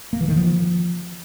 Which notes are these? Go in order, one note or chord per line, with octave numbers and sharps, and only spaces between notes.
A#3
E3
D#3
F3